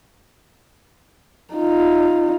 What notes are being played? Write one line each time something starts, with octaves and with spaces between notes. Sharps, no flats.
D#4 F4